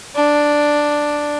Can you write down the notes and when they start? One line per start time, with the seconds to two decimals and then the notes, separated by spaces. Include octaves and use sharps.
0.15 D4